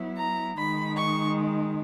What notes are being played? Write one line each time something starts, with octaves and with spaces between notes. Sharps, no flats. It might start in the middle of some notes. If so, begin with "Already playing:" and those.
Already playing: F#3 B3 E4
A#5
D#3 G#3 D#4 B5
C#6